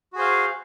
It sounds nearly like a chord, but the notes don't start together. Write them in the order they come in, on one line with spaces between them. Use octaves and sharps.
F#4 G#4 C5 F5